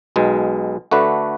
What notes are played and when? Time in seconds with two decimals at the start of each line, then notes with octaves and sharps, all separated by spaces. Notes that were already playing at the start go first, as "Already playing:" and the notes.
0.16 B1 B2 G#3
0.91 D3 A3 D4 F#4 B4